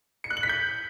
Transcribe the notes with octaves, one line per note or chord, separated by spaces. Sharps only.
C#7
F#6
F#7
B6
G6